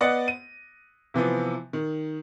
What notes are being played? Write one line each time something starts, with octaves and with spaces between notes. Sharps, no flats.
B3 D5 D#5 F#5
D#7
C3 E3 F3 B3
D#3